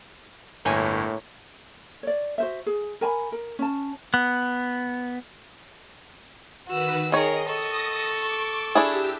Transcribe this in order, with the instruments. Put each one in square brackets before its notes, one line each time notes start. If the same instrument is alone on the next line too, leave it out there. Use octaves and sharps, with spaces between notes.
[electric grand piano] G1 [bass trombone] A2 [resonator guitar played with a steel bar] A#3 C#5 G#5
[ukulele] C#5 D5
F#4 C5 E5
G#4
A#4 G#5 A5 B5
A#4
C#4 A5
[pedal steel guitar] B3
[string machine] D#3 B4 [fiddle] F#4 E6
[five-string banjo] D#3 C#5 [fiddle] G#4 A#4 [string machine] D#5
[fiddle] A4 C#6 [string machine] D#6 A#6
[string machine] D6
[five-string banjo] D4 E4 G#4 [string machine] G4 E6